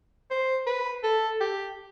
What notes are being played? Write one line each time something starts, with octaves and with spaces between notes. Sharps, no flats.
C5
B4
A4
G4